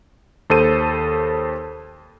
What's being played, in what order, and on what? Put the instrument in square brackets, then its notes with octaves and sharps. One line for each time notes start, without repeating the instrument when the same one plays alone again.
[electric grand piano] D#2 A4 C5 D#7